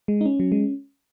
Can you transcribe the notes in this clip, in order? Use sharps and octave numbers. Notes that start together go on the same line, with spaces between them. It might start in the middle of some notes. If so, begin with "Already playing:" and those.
G#3
D#4
C#4
F#3
G#3